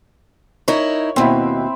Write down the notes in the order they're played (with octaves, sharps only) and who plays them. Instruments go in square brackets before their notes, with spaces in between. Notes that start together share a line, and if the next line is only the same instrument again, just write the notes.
[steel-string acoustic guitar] D#4 E4 A#4 [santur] C#5
[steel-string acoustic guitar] D#2 B2 [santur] C4 E4